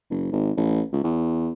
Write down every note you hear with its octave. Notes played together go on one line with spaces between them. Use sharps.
F#1
G#1
A1
C#2
E2